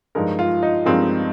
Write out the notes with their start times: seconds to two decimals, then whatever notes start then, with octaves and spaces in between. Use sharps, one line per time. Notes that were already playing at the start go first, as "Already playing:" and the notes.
0.15 G2 F3 G#3 D#4 A#4
0.39 F4
0.63 D#4
0.86 G2 F3 G#3 C4 D#4 A#4